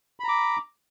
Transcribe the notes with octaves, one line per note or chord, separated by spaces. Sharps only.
A#5 B5 D6